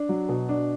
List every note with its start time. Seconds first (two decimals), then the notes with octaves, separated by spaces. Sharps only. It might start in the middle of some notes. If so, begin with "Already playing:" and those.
Already playing: D4
0.09 F#3
0.29 B2
0.49 D4